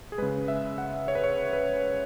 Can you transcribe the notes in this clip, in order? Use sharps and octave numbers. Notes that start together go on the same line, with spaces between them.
G#4
C#3 G#3 B4
E5
F#5
C#5
B4
C#5
B4